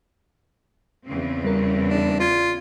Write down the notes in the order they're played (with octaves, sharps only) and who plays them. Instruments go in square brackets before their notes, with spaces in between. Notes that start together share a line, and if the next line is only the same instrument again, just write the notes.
[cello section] E2 C#3 C4
[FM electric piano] G3 A#4
[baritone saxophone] D4
[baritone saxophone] F4 [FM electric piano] D5 G#6